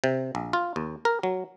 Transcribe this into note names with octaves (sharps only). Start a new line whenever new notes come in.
C3
A#1
F4
D#2
A#4
F#3